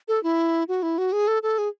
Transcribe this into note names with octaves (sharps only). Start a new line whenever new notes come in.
A4
E4
F#4
E4
F#4
G#4
A4
A4
G#4